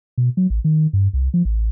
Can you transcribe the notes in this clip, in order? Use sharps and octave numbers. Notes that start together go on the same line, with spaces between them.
B2
F#3
A1
D#3
G2
C2
F3
A1